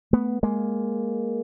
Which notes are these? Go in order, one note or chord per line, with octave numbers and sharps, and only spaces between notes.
A3 B3
G#3 A#3